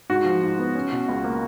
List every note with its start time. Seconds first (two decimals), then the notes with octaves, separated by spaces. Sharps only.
0.10 G#2 F#4
0.25 F3
0.43 G#2
0.59 B3
0.75 C#4
0.92 B2
1.09 C#2
1.24 A#3